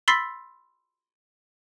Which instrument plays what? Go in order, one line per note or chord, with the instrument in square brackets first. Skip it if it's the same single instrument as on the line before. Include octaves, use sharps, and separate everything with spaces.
[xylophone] B5 C6 E6 A6 B6 C7